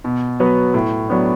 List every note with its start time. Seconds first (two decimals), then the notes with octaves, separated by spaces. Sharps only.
0.04 B2
0.40 F#3 B3 F#4 B4
0.74 A2
1.09 F#3 B3 D4